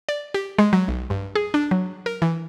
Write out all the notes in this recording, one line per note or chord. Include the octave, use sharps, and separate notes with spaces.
D5
G4
G#3
F#3
B1
G2
G#4
D4
F#3
A#4
E3